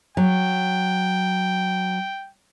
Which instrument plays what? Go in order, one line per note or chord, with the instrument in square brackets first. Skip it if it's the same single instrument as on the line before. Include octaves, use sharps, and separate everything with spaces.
[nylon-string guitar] F#3 [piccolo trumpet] G5